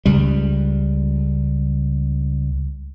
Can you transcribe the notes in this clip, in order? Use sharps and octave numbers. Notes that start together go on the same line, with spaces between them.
C#2 G3